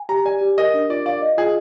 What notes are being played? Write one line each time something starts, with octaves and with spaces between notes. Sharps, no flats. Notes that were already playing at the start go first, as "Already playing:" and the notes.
Already playing: G#5
G4 A#5
D5 G#5
G4
A#4 D#5
D4
F4 D5
D5 F5
D#5
F4 G#4